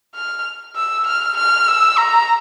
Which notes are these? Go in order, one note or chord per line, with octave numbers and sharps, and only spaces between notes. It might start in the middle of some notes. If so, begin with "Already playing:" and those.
F6
E6
F6
F6
E6
A#5